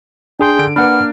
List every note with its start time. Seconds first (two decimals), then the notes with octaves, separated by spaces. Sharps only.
0.40 D4 G#4 G5 C6
0.59 D3 D7
0.76 A#3 D4 B4 F#5 B5 F6